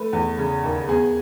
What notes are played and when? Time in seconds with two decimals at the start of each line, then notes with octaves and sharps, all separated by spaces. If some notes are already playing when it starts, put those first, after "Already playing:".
Already playing: A3 B4
0.13 E2
0.38 C#3
0.64 D#2
0.89 B3 G#4